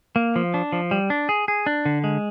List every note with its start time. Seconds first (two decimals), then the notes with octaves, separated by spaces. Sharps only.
0.16 A#3
0.36 F3
0.54 D4
0.73 F3
0.91 G3
1.10 D4
1.29 G#4
1.48 G#4
1.66 D4
1.85 D3
2.04 G#3